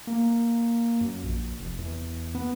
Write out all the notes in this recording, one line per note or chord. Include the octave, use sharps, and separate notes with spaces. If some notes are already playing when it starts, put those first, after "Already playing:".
A#3
F#2
A#1
F1
E2
B3